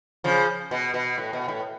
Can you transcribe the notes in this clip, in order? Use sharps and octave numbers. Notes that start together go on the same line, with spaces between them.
C#3 F3
B2
B2
A2
B2
A2